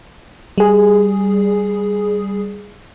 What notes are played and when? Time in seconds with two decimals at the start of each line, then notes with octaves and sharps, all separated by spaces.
0.58 G3 G#4